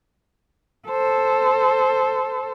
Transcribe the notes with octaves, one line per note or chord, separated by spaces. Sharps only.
A4 C5